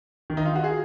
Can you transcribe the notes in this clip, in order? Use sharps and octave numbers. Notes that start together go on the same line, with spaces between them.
D#3
D#4
F4
F#4
G#4